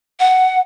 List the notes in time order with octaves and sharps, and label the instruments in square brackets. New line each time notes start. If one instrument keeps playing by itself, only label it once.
[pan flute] F#5